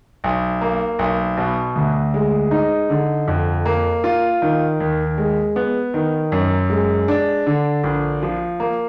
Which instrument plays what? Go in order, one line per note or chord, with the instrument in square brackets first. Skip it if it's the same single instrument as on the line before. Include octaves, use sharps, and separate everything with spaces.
[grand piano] B1
A#3
B1
B2
D2
G#3
D#4
D3
F2
A#3
F4
D#3
D#2
G#3
B3
D#3
F#2
G#3
D4
D3
A#1
F3
A#3